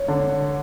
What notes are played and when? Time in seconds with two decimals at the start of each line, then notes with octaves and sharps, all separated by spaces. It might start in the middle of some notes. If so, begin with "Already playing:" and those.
Already playing: C#5
0.08 D3